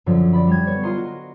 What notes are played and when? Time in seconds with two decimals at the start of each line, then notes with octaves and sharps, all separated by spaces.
0.06 F#2 D3 F3
0.33 D5 B5
0.47 G3 G#6
0.67 B3 C#5
0.83 F4 D#5 A#5 C6
0.98 F#4